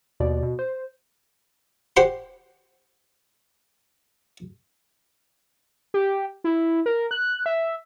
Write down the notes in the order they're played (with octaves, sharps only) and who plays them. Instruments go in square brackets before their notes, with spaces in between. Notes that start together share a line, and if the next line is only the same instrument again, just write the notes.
[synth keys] D#2 B2 D5
B2
C5
[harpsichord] G4 C5 F#5 C6
[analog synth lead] G4
E4
A#4
F#6
E5